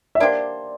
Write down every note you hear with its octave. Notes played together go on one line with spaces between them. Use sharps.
E5
A#3 D4 G4 C5 D5